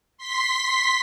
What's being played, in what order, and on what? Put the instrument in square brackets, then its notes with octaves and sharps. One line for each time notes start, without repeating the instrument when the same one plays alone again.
[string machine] C6 B6